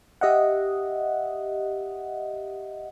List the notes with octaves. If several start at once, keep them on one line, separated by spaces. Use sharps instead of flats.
G4 D#5 E5 F#5